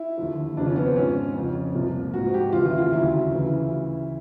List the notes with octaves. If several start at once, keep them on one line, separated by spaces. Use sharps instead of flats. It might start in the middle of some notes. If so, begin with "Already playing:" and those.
Already playing: E4
D#2 D3 F3
F2 C#3 F3 D4
C#4
B3
C4
G#2 F3 C#4
F2 C#3 F3
C2 A#2 F3
G#2 F3 F#4
G4
D#2 C#3 E3 F4
E4
F4
D2 C#3 F#3 E4
D2 C#3 E3